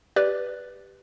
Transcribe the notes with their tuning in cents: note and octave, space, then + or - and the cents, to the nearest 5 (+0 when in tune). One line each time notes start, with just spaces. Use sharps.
G4 +0 B4 +0 D5 +0